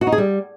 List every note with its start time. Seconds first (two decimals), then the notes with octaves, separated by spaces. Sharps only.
0.01 F#4
0.07 D#4
0.12 G#4
0.18 G3